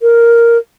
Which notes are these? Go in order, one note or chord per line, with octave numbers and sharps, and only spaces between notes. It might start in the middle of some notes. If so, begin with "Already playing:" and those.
A#4